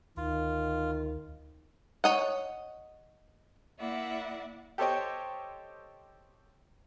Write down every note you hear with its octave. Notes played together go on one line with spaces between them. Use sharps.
D2 D#3 F4
C#5 D#5 F#5
A#3 E4 D5 E5 F#5
G4 A4 C5 C#5 D#5 G5